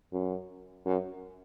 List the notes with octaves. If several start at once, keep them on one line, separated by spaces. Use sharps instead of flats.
F#2
F#2